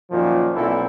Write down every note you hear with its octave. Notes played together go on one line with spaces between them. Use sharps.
F#2 A#2 D#3 F3
B1 A#2 C4 E4 A4